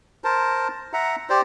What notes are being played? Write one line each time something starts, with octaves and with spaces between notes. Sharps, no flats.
A#4 C5 A5
E5 F#5 A#5
G4 C5 D5